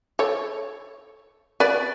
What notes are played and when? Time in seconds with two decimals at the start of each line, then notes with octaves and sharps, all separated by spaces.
0.19 A4 C#5
1.60 B4 D5